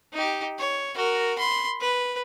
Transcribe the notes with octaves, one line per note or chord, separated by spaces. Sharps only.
D#4 G4
C#5
F#4 A#4
B5 C6
B4